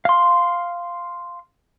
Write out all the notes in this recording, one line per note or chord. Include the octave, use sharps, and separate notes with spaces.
F5 C6